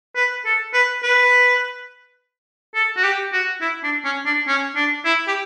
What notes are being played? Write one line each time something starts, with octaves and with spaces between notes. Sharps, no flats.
B4
A4
B4
B4
A4
F#4
G4
F#4
E4
D4
C#4
D4
C#4
D4
E4
G4